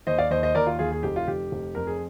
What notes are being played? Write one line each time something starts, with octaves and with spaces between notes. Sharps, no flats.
D#2 C5 D#5
D5 F5
D#2 C5 D#5
C5 D#5
D#2 A#4 D5
F4
D#2 F4 G#4
G#4
F1 G4
F4
F1 G4
F1
F2 A#4
G#4